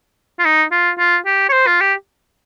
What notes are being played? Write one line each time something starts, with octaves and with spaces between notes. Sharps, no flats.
F4
D#4
F4
F4
G4
C#5
C5
F4
G4